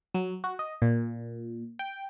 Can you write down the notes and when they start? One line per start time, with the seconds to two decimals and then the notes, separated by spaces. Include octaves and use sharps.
0.14 F#3
0.44 F#4
0.59 D#5
0.82 A#2
1.79 G5